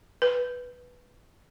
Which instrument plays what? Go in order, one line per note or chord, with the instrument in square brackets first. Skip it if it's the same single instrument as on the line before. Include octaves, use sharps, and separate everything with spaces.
[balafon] B4